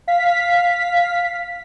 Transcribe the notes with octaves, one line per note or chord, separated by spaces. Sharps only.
F5 B6